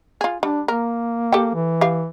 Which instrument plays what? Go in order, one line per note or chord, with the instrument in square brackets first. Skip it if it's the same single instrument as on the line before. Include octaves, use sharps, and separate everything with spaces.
[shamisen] F4 G#4
[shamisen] G3 [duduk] D4
[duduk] A#3 [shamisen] A#4
[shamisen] G4 A4 G5
[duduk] E3
[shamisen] G4 E5 F5